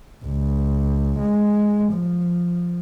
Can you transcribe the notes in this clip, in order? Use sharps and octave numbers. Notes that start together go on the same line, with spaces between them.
C#2
G#3
F3